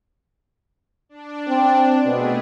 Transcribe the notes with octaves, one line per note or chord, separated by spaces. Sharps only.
D4
C4
B2 A3 G#4